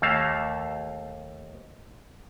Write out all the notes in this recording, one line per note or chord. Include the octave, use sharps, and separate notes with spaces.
D#2 A3 A#3 F5 A5